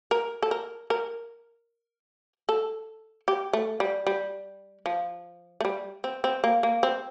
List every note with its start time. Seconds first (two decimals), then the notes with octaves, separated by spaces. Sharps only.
0.11 A#4
0.42 A4
0.51 A#4
0.90 A#4
2.49 A4
3.28 G4
3.53 A3
3.80 G3
4.07 G3
4.86 F3
5.60 A3
5.65 G3
6.04 C4
6.24 C4
6.44 A#3
6.63 A#3
6.83 C4